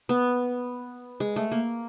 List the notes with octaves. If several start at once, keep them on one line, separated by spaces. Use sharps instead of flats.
B3
G#3
A3
A#3